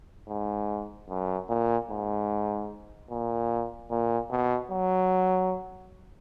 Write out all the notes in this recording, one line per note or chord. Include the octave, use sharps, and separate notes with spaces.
G#2
F#2
A#2
G#2
A#2
A#2
B2
F#3